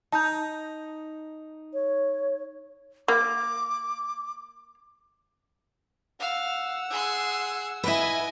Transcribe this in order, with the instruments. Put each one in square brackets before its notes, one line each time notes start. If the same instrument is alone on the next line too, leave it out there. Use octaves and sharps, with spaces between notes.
[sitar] D#4 [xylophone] A5 G6
[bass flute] C#5
[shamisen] A#3 [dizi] D6
[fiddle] F5 [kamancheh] F#5 E6
[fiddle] G#4 C6
[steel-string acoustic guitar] E4 B4 [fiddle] D#5 G#5